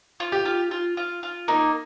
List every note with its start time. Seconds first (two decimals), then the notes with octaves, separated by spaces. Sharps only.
0.20 F4
0.32 G4
0.45 F4
0.71 F4
0.97 F4
1.23 F4
1.48 A#3 D#4